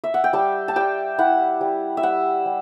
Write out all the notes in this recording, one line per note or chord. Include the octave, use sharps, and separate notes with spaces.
E5
F#5
G5
G3 A5
A5
G3 G5
E4 F#5
G3
E5
G3 F#5
G3